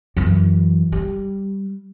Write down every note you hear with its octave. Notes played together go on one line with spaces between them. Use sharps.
F#2 E3
G3